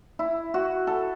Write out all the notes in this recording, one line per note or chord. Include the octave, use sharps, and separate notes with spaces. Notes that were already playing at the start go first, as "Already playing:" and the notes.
E4
F#4
A4